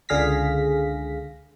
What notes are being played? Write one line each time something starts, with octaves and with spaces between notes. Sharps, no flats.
C#2 D3 G#4 F5 A#6 B6